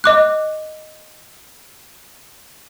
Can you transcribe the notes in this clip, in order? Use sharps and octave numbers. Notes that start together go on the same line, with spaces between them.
D#5 D6 F#6